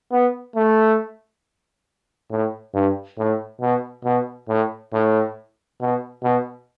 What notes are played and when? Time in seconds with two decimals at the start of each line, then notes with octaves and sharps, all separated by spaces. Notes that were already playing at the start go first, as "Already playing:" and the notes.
0.12 B3
0.56 A3
2.31 A2
2.74 G2
3.18 A2
3.61 B2
4.05 B2
4.48 A2
4.93 A2
5.81 B2
6.23 B2